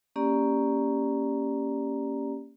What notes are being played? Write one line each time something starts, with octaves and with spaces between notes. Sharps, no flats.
A#3 C#4 G4 D5 A#5